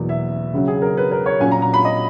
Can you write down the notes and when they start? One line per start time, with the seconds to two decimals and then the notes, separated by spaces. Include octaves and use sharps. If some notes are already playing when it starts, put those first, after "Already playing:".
Already playing: E2 B2 F#3 A#3
0.09 E5
0.53 C#3 F#3 C#4
0.68 G#4
0.82 A#4
0.97 B4
1.11 A#4
1.26 C#5
1.40 A#2 F#3 C#4 G#5
1.51 A#5
1.62 A#5
1.74 B5
1.85 D#5